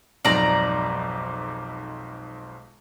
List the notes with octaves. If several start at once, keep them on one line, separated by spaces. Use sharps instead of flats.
B1 F2 G#2 D5 A#5